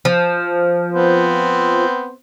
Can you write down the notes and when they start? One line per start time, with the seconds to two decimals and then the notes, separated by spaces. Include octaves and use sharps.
0.05 F3
0.93 B3 C4 C5